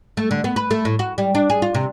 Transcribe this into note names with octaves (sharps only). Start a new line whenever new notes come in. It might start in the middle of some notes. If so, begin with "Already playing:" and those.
A3
D3
B3
B4
A3
A2
F#4
G3
D4
G#4
F4
C3